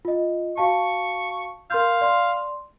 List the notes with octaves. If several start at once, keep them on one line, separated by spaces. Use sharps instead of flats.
F4 D#5
F#4 F5 A5 C#6
A#4 F5 C6 G6
D5 C6